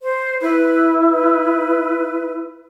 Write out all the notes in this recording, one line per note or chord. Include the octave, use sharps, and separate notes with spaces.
C5
E4 B4
B4